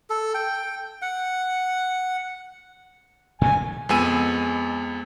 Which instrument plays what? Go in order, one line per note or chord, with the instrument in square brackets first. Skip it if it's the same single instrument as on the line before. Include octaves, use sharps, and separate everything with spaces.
[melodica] A4
G5
F#5
[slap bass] A#2 C#3 A3 [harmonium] G#5
[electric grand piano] F2 G#3 B3 G#5 E6 D#7